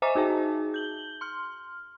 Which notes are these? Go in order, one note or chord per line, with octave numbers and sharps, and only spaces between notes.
C5 D#5 E5 G#5 A#5 D6
D#4 F#4 G#4 A5
G6 F#7 G7
C6 F6